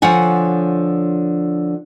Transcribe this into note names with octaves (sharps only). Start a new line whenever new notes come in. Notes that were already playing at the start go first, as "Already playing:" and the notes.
D3 F3 C#5 F#5 G#5